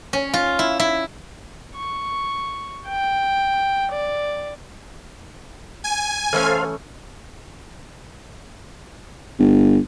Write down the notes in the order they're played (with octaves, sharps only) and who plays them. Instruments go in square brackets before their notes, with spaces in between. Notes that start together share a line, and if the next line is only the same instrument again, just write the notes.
[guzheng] C#4
F4
E4
E4
[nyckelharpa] C#6
G5
D5
[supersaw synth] G#5
[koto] E3 A3 C#4 [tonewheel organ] A4 C5 F5
[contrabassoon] G1